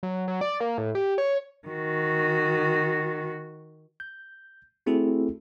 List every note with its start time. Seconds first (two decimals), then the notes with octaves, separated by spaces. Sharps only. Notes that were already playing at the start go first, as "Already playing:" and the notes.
0.03 F#3
0.28 F#3
0.41 D5
0.60 A#3
0.78 A2
0.95 G4
1.18 C#5
1.68 D#3 F#4
4.00 G6
4.86 A3 C4 E4 F#4 G#4 A4